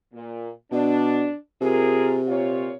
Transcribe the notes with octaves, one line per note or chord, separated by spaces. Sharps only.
A#2
B2 D4
C3 F4 G#4 A#4
A#2 F4 C#5